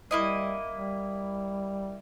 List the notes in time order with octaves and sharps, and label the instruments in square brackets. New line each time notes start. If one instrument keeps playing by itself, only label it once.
[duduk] G3 [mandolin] A#3 E4 D#5
[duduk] G3